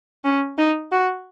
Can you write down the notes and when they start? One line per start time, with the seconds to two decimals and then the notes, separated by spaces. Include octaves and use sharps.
0.24 C#4
0.58 D#4
0.92 F#4